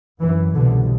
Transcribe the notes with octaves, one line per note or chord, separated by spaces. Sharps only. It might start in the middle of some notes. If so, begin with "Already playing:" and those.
F#2 E3
C2 B2 D3